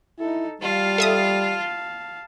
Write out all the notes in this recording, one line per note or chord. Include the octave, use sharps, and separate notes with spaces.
D#4 E4 A4
G3 F4 F5 A5
A4 E5 D#6